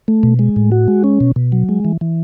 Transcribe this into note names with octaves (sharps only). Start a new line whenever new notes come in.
A3
B2
G#3
A2
F#4
G#3
C#4
B2
B2
F#3
G#3
E3
E3